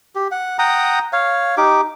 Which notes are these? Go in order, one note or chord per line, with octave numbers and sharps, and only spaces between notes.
G4
F#5
F#5 G5 A#5 D#6
C#5 F5
D#4 G4 D6